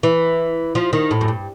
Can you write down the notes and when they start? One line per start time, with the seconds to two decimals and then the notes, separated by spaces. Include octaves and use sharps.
0.03 E3
0.75 F3
0.93 D#3
1.11 A2
1.21 F#2
1.28 G2